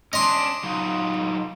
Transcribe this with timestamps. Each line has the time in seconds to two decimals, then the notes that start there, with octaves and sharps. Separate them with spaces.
0.13 C#4 D4 D#5 C6
0.64 F#3 D#4 F4